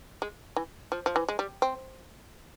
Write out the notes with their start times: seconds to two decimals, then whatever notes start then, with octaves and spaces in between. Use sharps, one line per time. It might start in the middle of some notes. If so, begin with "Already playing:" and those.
0.22 G#3
0.56 E3
0.92 F3
1.06 F3
1.16 E3
1.28 G#3
1.39 G3
1.62 C4